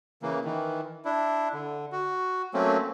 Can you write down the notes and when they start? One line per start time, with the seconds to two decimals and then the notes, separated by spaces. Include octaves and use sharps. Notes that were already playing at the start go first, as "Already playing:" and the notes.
0.22 C#3 E3 A#3
0.44 D#3 E3
1.05 D4 E4
1.53 D3
1.92 F#4
2.54 F#3 A3 A#3 C4 C#4